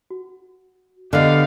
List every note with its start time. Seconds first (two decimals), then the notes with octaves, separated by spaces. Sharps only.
0.10 F#4
1.13 D3 B3 G4 D#5 F5 F6